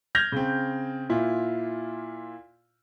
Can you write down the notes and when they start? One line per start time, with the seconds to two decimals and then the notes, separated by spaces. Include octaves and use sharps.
0.15 F6 G6 G#6 A#6 F7
0.32 C#3 C4
1.09 A#2 E4 F4